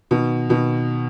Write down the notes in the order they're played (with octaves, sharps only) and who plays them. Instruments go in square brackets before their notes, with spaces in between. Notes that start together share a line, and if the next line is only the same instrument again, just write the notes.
[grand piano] B2 D#3
B2 D#3